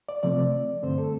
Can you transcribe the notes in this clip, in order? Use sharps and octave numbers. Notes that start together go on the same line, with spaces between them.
D5
C3 F3 A3 C4 D5
G2 D3 A3 C4 C5
A4